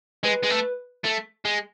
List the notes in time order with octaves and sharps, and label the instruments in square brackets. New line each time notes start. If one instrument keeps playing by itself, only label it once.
[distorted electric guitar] G#3 [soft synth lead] B4
[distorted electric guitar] G#3
A3
A3
G#3